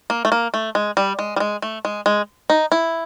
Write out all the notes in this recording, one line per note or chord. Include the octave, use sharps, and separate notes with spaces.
A#3
A3
A#3
A3
G#3
G3
G#3
G3
G#3
A3
G#3
G#3
D#4
E4